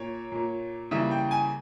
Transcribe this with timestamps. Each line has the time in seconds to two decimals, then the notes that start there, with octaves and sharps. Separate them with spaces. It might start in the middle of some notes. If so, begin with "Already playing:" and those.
Already playing: A#2 A#3 C#5
0.32 A#2 A#3
0.91 C#3 E3 G3 A#3 E5
1.11 G5
1.31 G#5